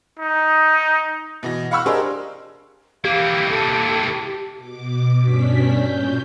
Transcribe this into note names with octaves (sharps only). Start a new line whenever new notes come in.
D#4
B2 E3 A#6
F5 F#5 B5 C#6 E6 F6
D4 G4 G#4 A#4 C5 D#5
E3 A#3 G4 F5
A4
B2 D6
G2 B2 C#4 D4 B6
A#2 C#4 G6